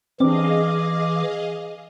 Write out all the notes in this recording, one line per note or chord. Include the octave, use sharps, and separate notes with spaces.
E3 C4 D4 G#4 D#5 F5 D6